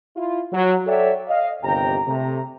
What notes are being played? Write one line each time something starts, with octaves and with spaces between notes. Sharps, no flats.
E4 F4
F#3
A4 C#5 D5 E5 F#5 G5
D#5 F5
G1 D#2 C3 G5 A#5
C3 A3 A#5